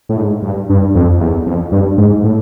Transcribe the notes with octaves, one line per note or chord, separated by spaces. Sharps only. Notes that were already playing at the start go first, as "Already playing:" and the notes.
A2
G#2
G2
G2
F2
E2
F2
G2
G#2
A2